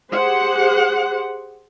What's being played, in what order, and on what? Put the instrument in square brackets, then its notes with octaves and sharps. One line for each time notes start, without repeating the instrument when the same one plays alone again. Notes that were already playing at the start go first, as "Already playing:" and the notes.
[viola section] G4 G#4 C5 F#5